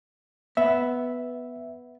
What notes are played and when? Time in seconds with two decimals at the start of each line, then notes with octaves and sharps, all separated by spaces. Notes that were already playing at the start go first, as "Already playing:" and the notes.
0.57 B3 E5